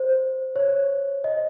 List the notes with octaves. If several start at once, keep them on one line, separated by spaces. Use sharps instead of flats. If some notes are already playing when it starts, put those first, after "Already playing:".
Already playing: C5
C#5
D#5